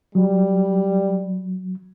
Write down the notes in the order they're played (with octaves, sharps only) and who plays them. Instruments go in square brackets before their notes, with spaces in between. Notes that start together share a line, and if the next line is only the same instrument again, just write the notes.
[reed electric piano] F#3 [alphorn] G3